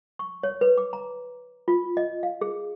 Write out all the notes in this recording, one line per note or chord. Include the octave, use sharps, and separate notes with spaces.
C#6
C#5
B4
D6
A#5
F4
D#5
F5
G#4